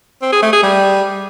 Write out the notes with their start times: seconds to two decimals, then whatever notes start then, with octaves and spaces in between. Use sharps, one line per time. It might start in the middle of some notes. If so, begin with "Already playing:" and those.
0.22 C4
0.32 G#4
0.43 A3
0.53 G#4
0.63 G3